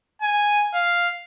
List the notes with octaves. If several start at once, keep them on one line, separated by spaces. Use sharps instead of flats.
G#5
F5